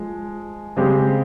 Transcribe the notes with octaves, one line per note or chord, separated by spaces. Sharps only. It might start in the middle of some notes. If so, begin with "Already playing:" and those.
Already playing: F3 G#3
C#3 G#3 C4 G4